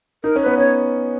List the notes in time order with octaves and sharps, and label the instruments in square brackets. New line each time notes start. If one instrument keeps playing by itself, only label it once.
[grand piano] D#4 [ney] A#4
[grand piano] C#4
[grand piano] B3 [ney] B4
[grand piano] C#4 [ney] C#5